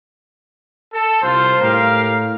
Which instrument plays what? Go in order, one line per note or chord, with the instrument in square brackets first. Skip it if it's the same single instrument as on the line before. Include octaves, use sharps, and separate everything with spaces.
[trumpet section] A4
[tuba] C2 [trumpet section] F4 C5
[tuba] A2 [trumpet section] G4 A#4 F5